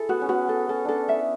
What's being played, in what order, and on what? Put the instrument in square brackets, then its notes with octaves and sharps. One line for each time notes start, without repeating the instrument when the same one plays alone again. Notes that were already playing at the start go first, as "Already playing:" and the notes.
Already playing: [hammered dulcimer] E4 G#4 [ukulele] A4
[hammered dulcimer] B3 [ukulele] F#4
[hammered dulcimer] C#4
[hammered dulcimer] B3 [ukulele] F#4
[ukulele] A4
[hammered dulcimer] C#4 [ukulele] A4
[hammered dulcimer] C#4 D4 [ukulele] A4
[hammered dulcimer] E4 [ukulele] E5